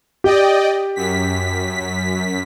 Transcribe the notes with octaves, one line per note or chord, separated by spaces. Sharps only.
G4 D5 D#5 G5
F#2 B6